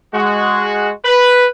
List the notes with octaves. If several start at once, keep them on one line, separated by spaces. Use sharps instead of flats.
G#3 F#4
B4